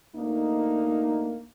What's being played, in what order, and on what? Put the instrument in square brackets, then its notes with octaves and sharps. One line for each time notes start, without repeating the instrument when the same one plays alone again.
[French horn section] D2 A#3 D4 D#4